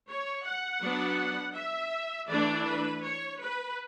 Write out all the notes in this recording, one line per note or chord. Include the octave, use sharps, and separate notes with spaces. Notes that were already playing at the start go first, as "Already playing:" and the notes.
C#5
F#5
F#3 B3 D4
E5
E3 A3 D4 D5
B4
C#5
B4